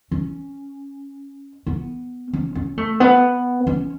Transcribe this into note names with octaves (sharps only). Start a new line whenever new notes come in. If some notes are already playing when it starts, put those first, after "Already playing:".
C#4
B3
C#4
C#4
A3
B3
C#4